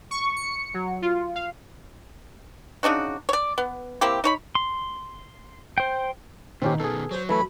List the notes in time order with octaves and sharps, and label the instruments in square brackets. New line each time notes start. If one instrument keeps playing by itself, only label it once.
[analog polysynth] C#6
C#7
F#3
F4
F5
[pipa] C#3 D4 D#4 F#4
C#5 D5
B3
A#3 C4 E4 G4
D#4 C#5 B5
[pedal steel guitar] C6
C5 G5
[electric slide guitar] A#2 [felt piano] D#3 D#4 [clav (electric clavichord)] C4 C#4 G4
[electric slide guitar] B2 D#3 [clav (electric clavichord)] G#4 A4 [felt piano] B4
[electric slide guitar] F#3 [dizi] C5
[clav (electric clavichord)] E3 A3 E4 [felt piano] F#4 [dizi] B5